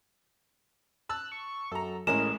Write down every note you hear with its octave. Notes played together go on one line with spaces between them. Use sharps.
A5 E6 F#6
C#6
F#2 A4 A#5
A1 A2 G#3 C#4 G#4 A#4 E7